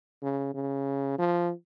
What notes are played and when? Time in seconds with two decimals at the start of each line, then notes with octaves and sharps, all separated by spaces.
0.23 C#3
0.54 C#3
1.19 F3